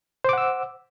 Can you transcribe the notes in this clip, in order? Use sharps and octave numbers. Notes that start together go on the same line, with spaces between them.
C5 F#5 D6 E6